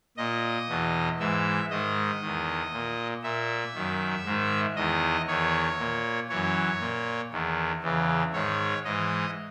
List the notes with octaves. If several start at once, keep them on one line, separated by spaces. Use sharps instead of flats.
A#2 D#5
E2 B2
G#2 E3 E5
G#2 D#3 D#5
E2 D#3
A#2
A#2 E5
F#2 D#3
G#2 D#3
E2 D#3 D#5
E2 D#3 C#5
A#2
F#2 E3 C#5
A#2
E2 D#3
E2 C#3 E3
G#2 D#3 C#5
G#2 E3 D#5